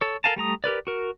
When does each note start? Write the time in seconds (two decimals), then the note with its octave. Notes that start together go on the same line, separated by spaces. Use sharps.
0.01 A4 C#5
0.24 A4 A#4 F5 G#5 A5
0.36 G3 A3 A#5 D#6
0.64 G4 A#4 B4 D5
0.87 F#4 A#4